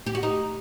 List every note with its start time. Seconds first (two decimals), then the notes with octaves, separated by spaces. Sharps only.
0.06 G4
0.15 F#4
0.23 D#4